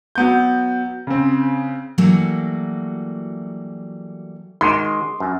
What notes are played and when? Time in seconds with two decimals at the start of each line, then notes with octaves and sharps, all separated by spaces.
0.15 F#3 B3 G6
1.07 C#3 C4
1.98 E3 F#3 G3 A3 A#3 F#4
4.61 D#3 G#3 F#4 C6 D6
5.20 F#2